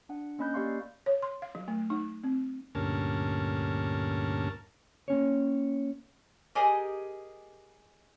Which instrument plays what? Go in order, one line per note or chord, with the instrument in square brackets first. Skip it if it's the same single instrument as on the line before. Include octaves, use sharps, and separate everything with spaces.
[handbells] D4 F#5
A#3 C#4 D#5 B5 F#6 G6
A#3 G4 D5 F5 C6 C#6
[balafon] C#5
C6
F5
F#3
A3
D#4
C4
[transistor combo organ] D2 G2 A#2 C#4 A#4 A5
[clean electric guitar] A#3 C#4 C#5
[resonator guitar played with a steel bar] G4 G#4 A#4 D#5 G#5